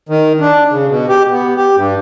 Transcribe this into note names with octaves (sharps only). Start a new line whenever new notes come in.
D#3
D4
C#3
B2
G4
B3
G4
G2